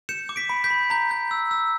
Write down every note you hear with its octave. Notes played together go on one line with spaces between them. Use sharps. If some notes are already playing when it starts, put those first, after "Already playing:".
G6 C#7 E7
D6
B6 D7
B5
G6 B6
B5
A#5 G6
G6
E6
E6